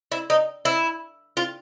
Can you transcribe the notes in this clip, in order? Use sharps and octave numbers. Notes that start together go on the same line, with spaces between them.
E4
D#4
E4
F4